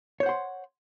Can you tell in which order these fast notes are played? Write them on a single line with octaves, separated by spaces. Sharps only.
C#5 C5 F#5 C6